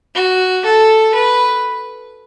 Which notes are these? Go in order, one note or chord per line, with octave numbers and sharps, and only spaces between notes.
F#4
A4
B4